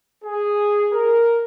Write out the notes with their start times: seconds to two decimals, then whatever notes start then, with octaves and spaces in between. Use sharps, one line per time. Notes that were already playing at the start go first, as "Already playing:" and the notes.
0.24 G#4
0.93 A#4